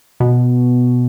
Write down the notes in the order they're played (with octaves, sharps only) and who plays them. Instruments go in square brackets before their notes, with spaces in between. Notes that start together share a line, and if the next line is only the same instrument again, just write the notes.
[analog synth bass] B2